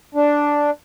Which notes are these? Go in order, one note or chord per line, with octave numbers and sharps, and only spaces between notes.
D4